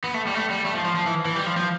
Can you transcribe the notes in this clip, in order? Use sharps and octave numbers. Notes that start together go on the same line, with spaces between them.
B3
A3
G3
A3
G3
A3
F3
F3
F3
E3
E3
G3
F3
F3